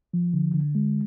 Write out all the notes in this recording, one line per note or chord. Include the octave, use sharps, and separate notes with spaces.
F3
D3
D3
G#3